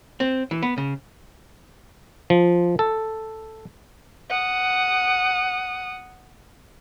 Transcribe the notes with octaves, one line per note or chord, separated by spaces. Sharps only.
C4
E3
B3
C#3
F3
A4
F#5 D#6